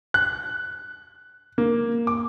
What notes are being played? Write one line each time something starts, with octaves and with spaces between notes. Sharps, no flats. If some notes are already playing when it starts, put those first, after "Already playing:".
F#6
A#3
D6